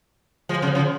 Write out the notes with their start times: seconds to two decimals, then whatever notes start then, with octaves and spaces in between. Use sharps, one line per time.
0.49 F3 G#3
0.62 C#3 F3
0.75 C#3 F3